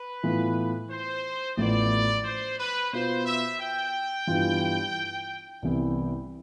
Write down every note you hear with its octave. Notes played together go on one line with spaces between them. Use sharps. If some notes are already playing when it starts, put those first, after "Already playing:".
Already playing: B4
A2 E3 B3 F4
C5
A1 A2 F3 B3 D5
C5
B4
B2 B3 F4 C5
E5
G5
G2 E3 B3 F4
C2 C3 E3 B3 E4